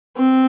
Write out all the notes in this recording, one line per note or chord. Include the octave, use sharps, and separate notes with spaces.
C4